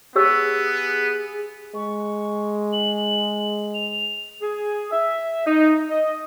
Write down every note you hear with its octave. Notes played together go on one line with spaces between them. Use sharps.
B3 G4 G#4 C#5 E6
G#3 C#6
F#7
F7
G#4
E5
D#4
D#5